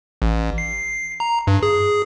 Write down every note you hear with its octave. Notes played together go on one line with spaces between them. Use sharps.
A1
C7
A#5
G2
G#4